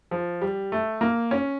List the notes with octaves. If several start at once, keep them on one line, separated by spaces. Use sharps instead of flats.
F3
G3
A3
A#3
C#4